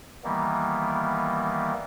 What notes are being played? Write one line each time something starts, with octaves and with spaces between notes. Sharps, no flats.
D#3 E3 G3 A#3 B3